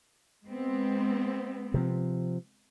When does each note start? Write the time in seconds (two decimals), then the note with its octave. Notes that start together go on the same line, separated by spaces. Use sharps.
0.45 G#3 B3 C4
1.74 C3 F3